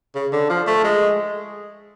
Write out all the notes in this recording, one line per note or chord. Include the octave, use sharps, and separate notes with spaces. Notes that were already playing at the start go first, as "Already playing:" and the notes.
C#3
D3
F3
A3
G#3